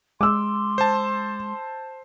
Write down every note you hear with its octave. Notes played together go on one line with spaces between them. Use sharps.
G#3 C6 D6 E6
C5 A5